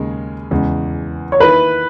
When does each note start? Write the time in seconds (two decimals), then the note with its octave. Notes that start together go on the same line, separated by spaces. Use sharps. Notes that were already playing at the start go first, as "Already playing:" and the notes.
Already playing: D#2 C#3 G#3 D#4
0.51 E2 C#3 G#3
1.32 C#5
1.40 D#3 A#3 E4 B4